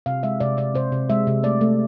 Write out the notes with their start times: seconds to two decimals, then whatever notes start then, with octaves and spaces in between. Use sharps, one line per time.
0.06 C3 F5
0.23 G#3 E5
0.40 C3 D5
0.57 C3 D5
0.75 C3 C5
0.92 C3
1.10 G#3 E5
1.27 C3
1.43 A3 D5
1.61 A3